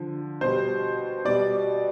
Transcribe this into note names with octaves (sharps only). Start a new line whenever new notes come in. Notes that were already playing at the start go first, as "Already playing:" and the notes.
Already playing: D3 F3
B2 G3 C5
B2 G3 D5